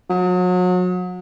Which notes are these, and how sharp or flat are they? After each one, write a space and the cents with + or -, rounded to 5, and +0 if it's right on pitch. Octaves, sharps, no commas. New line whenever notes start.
F#3 -35